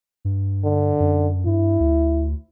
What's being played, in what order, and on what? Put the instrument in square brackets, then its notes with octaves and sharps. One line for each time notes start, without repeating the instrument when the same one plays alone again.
[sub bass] G2
[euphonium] D3
[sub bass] F#2
[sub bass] G2 [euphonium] E4
[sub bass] D2